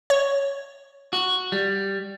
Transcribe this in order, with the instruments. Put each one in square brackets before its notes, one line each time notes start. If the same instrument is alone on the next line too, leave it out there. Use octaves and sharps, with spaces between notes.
[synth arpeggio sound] C#5
[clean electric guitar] F#4
G3